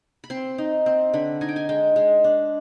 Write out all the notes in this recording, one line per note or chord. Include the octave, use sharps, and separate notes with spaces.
B5
C4 C6
D#4
C4
D3 B5
D#4 G#5
G5
G#5
G#3 G5
G#3
D4